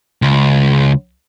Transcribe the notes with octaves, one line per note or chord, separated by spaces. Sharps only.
C#2